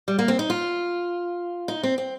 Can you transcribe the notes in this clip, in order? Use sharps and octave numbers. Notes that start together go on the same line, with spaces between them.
G3
A#3
C4
D#4
F4
D#4
C4
C4